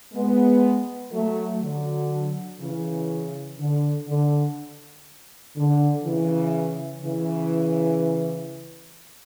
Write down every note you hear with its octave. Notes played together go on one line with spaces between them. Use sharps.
G#3 B3
F#3 A3
D3 F#3
C#3 E3
D3
D3
D3
C#3 E3
C#3 E3